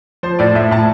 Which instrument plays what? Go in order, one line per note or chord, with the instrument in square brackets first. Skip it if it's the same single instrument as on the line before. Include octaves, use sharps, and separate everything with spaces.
[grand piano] F3 C5
A2 D5
A2 E5
A2 A5